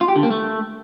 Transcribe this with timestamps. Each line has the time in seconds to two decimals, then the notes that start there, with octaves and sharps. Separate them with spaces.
0.01 F4
0.08 G4
0.16 D3
0.23 A#3
0.30 A3